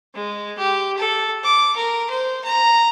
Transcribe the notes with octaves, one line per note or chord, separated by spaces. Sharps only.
G#3
G4
A4
D6
A#4
C5
A#5